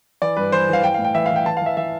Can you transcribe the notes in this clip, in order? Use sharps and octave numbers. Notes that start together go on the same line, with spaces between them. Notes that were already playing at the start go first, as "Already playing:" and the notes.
E3 D5
G2 B4
E3 C5
E3 F5
E3 G5
F5
A2
G5
E3 E5
F5
E3 G5
E3 A5
F5
E3 E5
E3 E5